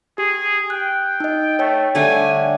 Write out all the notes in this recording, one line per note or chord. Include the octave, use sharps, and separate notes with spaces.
G4 G#4
G5 F#6
D#4 D#5
A3 C#5 G5
D3 G3 A3 G#5